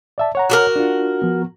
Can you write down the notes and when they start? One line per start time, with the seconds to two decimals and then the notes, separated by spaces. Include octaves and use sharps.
0.18 D5 E5 A5
0.35 C#5 F#5 A#5
0.50 F#4 G4 A#4
0.76 D4 F4
1.22 F3 B3